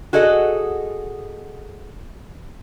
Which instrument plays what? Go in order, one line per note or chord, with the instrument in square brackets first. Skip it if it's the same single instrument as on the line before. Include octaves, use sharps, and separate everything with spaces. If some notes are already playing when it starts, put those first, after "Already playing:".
[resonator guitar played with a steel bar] F#4 G#4 A4 D#5 F#5